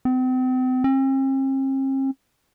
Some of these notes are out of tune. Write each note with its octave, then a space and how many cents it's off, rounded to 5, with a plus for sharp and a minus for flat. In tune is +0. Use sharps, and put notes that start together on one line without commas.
C4 -40
C4 +45